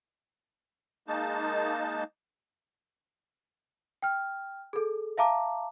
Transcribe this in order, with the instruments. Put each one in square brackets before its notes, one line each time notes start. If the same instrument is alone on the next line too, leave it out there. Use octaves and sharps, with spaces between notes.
[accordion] G#3 A#3 D#4 A5
[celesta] G5 F6
G#4 A4
E5 F5 A5 A#5 D6